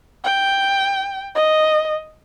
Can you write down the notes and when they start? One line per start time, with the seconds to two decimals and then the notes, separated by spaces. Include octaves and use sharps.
0.24 G5
1.35 D#5